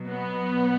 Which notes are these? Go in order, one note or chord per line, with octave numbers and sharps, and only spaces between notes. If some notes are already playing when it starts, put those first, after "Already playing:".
Already playing: B2 F#3
B3